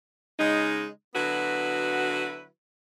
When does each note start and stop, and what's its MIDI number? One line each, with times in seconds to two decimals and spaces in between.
0.39 0.87 49
0.39 0.87 56
0.39 0.87 63
1.15 2.46 50
1.15 2.46 54
1.15 2.46 59
1.15 2.46 64
1.15 2.46 66
1.15 2.46 71